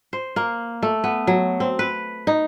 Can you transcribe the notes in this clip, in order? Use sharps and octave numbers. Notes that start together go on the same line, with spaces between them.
C5
A#3
A3
B3
F#3
C4
B4
D#4